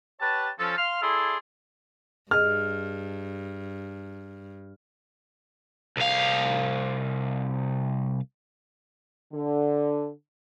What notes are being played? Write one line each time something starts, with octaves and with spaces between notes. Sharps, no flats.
G4 B4 C#5 F#5 A5
F3 C#4 A4
F5 C6 F6
E4 G#4 A4 D5 E5 C6
G2 G#4 D#5 F6
C2 F5
D3